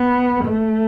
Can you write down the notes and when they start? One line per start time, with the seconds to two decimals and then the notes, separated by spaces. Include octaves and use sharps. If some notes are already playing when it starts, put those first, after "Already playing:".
Already playing: B3
0.44 A3